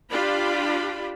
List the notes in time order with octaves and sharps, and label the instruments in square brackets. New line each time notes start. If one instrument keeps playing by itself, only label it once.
[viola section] D4 F4 G4 B5